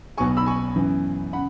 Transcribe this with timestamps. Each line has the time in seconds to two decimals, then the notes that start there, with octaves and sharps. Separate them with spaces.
0.18 B1 B2 B3 G#5 C#6
0.37 B5 E6
0.46 G#5 C#6
0.76 F#2 E3 B3
1.33 C#3 F#5 B5